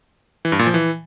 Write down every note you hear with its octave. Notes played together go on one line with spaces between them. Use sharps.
E3
G2
A#2
F3
E3